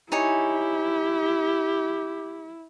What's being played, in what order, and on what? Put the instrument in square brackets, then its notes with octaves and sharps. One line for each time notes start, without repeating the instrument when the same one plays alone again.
[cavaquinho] D#4 C#5 G#5 [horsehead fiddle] E4 [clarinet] G4